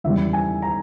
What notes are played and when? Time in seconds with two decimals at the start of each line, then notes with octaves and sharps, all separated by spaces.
0.04 E2 C#3 E3 G3 E5
0.33 G#5
0.62 A#5